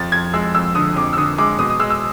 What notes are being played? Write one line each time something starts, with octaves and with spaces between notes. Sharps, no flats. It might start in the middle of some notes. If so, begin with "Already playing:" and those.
Already playing: F2 A6
F2 G#6
G#3 E6
F2 E6
D3 D#6
F2 D6
E6
D3 D#6
G#3 D6
B2 D#6
D#6
G#3 E6
E6